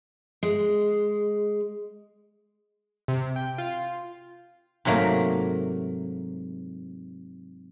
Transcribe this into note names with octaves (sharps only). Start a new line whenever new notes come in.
G#3
C3
G5
F4
G#2 C3 F#3 A3 A#3